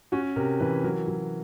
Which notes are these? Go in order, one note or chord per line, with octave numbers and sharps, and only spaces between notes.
C#4 F#4
C3 A#4
E3 B4
F#3 A#4
F#3